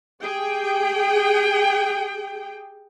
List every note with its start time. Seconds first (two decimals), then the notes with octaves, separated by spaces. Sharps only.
0.22 G4 G#4 G5